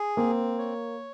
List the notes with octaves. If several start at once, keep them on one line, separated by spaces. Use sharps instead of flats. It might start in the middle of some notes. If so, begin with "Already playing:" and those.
Already playing: G#4
A#3 C4
C#5